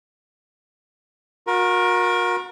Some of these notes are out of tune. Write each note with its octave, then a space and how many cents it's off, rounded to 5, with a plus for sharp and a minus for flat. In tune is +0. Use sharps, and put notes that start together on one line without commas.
F#4 -40 A#4 +20